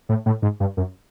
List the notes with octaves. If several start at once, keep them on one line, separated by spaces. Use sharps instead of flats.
A2
A2
G#2
G2
F#2